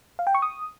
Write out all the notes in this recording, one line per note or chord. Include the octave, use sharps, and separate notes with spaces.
F5
G5
C#6
D#6